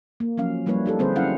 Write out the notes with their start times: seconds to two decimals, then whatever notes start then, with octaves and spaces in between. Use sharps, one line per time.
0.20 A#3
0.38 F3 F#3 C#4 F5
0.66 F3 G3 A#3 E4 B4 C#5
0.86 D#4 G4 A4
0.99 D3 G3 C4 G#4 B4 C5
1.16 F#3 C#4 E4 F5 F#5